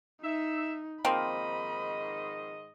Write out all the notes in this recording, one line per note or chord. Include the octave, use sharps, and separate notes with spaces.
D#4 E5
G#2 D#3 F3 A#3 C4 D#5 B5